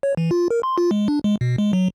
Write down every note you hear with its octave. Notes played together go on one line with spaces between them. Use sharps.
C#5
E3
F4
A#4
C6
F4
G#3
D4
G#3
B2
G#3
F#3